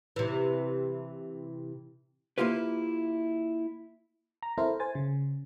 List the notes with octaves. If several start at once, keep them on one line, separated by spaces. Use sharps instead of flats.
C3 E3
A#3 E4 F4 G4 B4
A#5
C4 E4 A4 A#4 C5
C5 G#5 A6
C#3